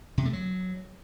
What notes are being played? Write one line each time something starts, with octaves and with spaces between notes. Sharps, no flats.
C3
A3
F#3